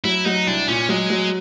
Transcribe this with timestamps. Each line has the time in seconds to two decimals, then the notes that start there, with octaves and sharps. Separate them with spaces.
0.04 F#3 E4
0.25 F#3 D#4
0.47 C2 D4
0.68 A#2 C#4
0.89 F#3 G#3
1.10 F#3